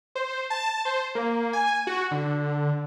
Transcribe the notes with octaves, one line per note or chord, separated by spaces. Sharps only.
C5
A5
C5
A#3
G#5
F#4
D3